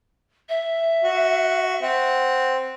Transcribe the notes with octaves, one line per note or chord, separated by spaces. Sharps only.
E5
F#4
C4 F#5